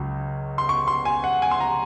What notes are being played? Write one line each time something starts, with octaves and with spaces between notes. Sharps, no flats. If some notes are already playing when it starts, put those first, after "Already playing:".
Already playing: C#2 C#3 F#3
C6
C#6
C6
G#5
F#5
G#5
C6
A#5